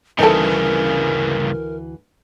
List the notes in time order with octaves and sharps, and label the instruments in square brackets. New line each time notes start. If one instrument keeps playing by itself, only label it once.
[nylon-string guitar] D2 E3 E4 [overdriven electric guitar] G2 C#3 [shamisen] D#4 A4 [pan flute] A#4